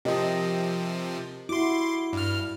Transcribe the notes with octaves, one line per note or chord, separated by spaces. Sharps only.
C3 F3 G4 A#4 D#5
E4 F#4 C6 D6
G2 F6